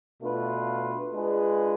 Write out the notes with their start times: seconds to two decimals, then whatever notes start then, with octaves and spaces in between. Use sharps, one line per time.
0.22 B2 A3 D4 F4 B4
1.14 G#3 D4 F4 G#4 B4